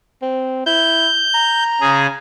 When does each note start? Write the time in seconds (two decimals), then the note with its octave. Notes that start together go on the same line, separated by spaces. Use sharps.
0.22 C4
0.66 E4 G6
1.34 A#5
1.81 C#3 G#4